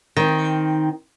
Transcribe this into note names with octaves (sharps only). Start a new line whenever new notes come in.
D#3 C4